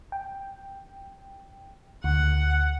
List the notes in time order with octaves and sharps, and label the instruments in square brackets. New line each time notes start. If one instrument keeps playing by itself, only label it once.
[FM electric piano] G5
[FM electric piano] D2 [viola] F#5